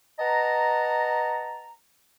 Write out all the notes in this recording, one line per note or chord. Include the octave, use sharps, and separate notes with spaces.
B4 D#5 F#5 A5 A#5